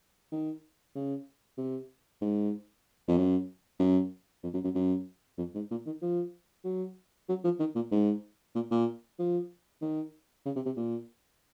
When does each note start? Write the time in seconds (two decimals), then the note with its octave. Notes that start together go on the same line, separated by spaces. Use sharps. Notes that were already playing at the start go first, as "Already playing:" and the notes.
0.32 D#3
0.95 C#3
1.58 C3
2.21 G#2
3.08 F2
3.17 F#2
3.80 F#2
4.43 F2
4.54 F#2
4.64 F#2
4.75 F#2
5.38 F2
5.55 G#2
5.71 A#2
5.86 D#3
6.02 F3
6.65 F#3
7.29 F#3
7.44 F3
7.60 D#3
7.75 A#2
7.92 G#2
8.55 A#2
8.71 A#2
9.19 F3
9.82 D#3
10.46 C#3
10.56 C3
10.66 C3
10.77 A#2